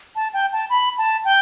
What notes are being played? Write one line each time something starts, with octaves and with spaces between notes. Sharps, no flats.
A5
G5
A5
B5
A5
G5